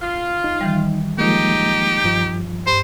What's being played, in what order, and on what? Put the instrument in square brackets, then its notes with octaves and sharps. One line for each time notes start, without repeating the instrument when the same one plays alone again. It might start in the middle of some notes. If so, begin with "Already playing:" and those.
[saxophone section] F4
[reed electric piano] D#4
[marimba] D#3 E3 G3
[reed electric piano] F3 G#3 A#3 [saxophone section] D#4 [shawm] G4
[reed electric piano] G2 F3
[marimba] G2 [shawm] C5